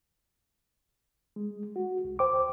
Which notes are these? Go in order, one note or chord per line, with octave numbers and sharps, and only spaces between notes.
G#3
F#4
C2
D2 C5 G5 D6